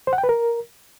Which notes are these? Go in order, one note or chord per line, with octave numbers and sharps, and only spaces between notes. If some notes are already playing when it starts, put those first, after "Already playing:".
C5
F#5
G5
B4
A#4